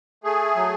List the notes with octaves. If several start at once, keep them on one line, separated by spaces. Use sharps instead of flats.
A3 G#4
F#3